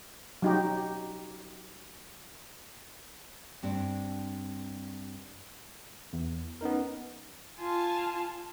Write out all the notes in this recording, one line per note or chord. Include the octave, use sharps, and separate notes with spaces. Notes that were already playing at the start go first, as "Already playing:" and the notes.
F#3 D#4 G4
G2 C4 D4
E2
B3 C#4 D#4 A#4
F4 G#5 A5